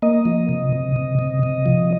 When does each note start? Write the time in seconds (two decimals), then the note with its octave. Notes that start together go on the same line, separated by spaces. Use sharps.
0.02 A#3 D#5
0.25 F3
0.49 C3
0.72 C3
0.96 C3
1.19 C3
1.43 C3
1.66 F3